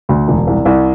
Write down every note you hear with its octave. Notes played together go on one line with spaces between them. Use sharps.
D2
E1
C2
C2